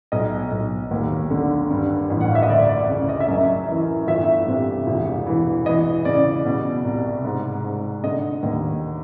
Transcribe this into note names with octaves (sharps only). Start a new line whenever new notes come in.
B1 D#5
B1
D#2
D3
G2
A1
F#5
F5
E5
D#5
D2 D5
D5
C#3 D5
D#5
E5
F#2 D#5
E3
G1 E5
C3
E1
E3
E3 D#5
C#3 D5
B2
C2
G#2
G#2
D3 D#5
D#2